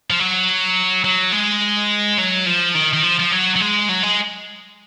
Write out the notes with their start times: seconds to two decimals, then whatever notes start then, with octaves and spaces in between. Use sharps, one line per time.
0.10 F3
0.19 F#3
1.04 F#3
1.32 G#3
2.18 F#3
2.46 F3
2.75 D#3
2.93 D#3
3.03 F3
3.20 F3
3.32 F#3
3.56 F#3
3.61 G#3
3.89 F#3
4.03 G#3